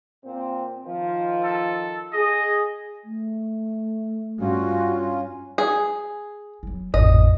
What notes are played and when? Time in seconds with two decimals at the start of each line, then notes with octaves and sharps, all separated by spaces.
0.24 A#2 C4
0.85 D#3 F3
1.44 A4
2.13 G#4 D#5
3.05 A3
4.40 G2 C#4 F4 F#4
5.58 G#4
6.63 F#3 E4
6.94 A1 F2 G#2 D#5